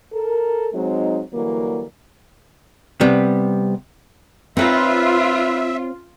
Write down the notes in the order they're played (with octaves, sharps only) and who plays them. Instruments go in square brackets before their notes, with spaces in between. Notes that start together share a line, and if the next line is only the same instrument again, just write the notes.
[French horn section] A4 A#4
F#3 G#3 C4 D#4
D3 E3 F#3 G3 A#3
[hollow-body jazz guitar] C3 G3 B3
[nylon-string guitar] C4 C#5 [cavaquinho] D#4 B4 A#5 [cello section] F4 [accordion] E5